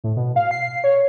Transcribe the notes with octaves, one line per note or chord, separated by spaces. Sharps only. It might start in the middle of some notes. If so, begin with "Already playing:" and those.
A2
B2
F5
C7
C#5